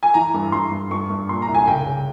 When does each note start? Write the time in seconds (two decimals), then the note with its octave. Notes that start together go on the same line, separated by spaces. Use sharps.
0.03 G#5
0.14 E3 A#5
0.34 G2
0.52 G2 C6
0.72 G2
0.91 G2 C#6
1.10 G2
1.29 A#2 C6
1.42 A#5
1.47 C2
1.55 G#5
1.67 C#3 G5
1.86 C#3